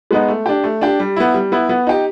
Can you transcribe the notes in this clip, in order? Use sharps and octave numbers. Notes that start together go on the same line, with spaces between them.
G#3 B3 D#4
A3
D4 G4
A3
D4 G4
G3
B3 E4
G3
B3 E4
B3
D#4 G4